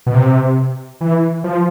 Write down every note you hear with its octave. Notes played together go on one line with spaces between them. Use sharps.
B2
C3
E3
F3